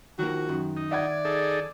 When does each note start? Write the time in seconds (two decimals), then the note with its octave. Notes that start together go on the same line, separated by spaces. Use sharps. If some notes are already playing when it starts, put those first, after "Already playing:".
0.19 D#3 F3 A#3 F#4
0.49 F#2 D#3
0.77 D#4
0.91 D5 E5 F#5 G#6
1.25 D#4 G#4 A4